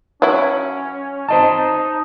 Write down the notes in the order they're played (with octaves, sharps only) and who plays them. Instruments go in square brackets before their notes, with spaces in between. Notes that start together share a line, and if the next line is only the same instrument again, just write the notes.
[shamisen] F#3 E4 [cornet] C#4
[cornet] D#4 [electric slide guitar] C5 D#5 A5